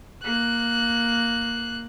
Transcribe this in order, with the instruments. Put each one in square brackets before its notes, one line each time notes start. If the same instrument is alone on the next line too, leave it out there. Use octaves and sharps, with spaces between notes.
[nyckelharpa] A#3 [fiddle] F#6